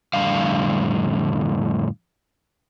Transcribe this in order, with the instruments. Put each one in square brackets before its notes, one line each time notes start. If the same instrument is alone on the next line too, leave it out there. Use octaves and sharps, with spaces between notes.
[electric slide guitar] F2 A2 D3 G3 F5